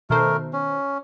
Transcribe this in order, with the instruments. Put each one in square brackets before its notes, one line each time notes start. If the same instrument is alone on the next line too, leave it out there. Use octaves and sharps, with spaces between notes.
[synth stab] B2 D#3 C5 [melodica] A3 A#4
[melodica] C#4